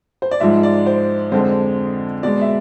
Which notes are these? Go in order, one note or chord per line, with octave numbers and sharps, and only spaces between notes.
C5
D5
G#2 F3 G#3 E5
D5
C5
F2 D3 G#3 C5
B2 G#3 D5
E5